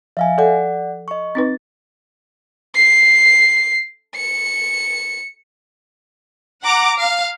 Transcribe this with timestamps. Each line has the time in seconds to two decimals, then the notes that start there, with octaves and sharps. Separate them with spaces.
0.17 F3 E5 F5 G#5
0.38 A4 D5 F#5
1.08 D#5 C#6
1.35 C4 D#4 B4 A6
2.76 C7
4.16 C#7
6.64 F#5 A#5 D6
6.98 F5